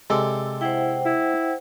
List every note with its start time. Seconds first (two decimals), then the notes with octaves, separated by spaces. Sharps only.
0.10 C3 G#3 A4 D5
0.61 E4 C5 F#5 G5
1.05 E4